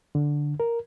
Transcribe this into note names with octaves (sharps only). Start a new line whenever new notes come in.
D3
A#4